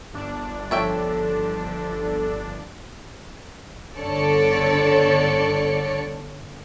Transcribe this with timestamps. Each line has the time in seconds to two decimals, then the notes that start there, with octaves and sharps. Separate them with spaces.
0.14 G1 D4
0.71 F3 A4 C#5 E5 G5
3.97 G1 D3 A4 C#5 D5 C#7